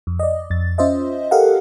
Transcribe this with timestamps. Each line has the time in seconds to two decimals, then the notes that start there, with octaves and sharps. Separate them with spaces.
0.07 F2
0.19 D5 D#5
0.50 F2 A6
0.78 C#4 F4 C5 D#5 E5
1.31 G4 A4 A#4 D#5 F5 F#5